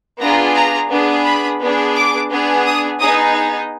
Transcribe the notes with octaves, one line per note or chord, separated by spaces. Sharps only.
B3 D4 F4 G#4 A#5
A#5
B3 D4 G#4
B5
B3 D4 G#4
D6
B3 D4 G#4
D#6
B3 D#4 G#4 D#6